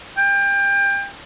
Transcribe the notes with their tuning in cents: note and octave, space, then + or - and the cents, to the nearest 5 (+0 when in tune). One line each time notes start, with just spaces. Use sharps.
G5 +30